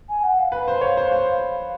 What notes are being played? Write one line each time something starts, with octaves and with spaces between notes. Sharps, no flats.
G#5
F#5
F5
B4
C5
C#5
C5
C5